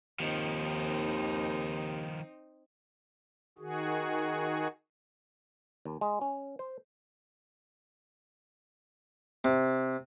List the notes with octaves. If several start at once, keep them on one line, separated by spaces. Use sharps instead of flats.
D#2 D#3 F3 C4 D#4
D#3 F#4 G#4
D#2
G#3
C#4
C5
C3